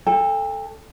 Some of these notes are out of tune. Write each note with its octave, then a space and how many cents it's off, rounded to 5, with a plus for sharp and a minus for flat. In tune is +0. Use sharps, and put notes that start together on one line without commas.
A4 +0 G5 +40